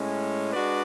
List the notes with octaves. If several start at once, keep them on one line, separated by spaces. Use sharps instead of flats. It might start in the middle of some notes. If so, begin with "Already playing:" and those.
Already playing: A2 G#3 C#4
G#3 D4 F#4 B4 D5